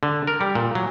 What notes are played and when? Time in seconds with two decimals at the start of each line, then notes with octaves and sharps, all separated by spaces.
0.03 D3
0.27 A#4
0.41 G3
0.55 A#2
0.75 F#3